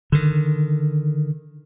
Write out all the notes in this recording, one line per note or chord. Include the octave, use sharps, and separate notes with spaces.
D3 D#3